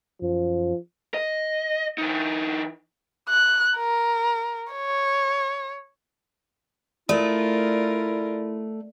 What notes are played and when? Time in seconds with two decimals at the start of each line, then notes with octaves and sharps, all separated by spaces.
0.22 F#2 F3
1.14 D#5
1.98 E3 D#4
3.30 F#6
3.77 A#4
4.73 C#5
7.09 A3 E4 F4 A#4 D5